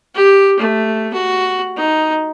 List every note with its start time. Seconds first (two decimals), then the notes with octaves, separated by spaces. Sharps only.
0.14 G4
0.59 A3
1.13 F#4
1.77 D#4